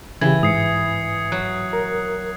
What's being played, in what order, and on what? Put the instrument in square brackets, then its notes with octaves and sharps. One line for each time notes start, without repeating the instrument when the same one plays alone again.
[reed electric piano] C#3 G4 [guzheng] E3 [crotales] G#6
[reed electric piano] G#2 [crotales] D#6 C7 C#7
[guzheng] F#3 [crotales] F#6
[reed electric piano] A#4